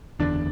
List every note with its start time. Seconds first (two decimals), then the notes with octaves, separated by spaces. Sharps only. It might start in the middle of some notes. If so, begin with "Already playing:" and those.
0.19 F#1 E2 D3 D4